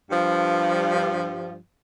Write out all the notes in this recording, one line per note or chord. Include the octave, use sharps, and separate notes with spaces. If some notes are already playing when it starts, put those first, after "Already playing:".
G2 F3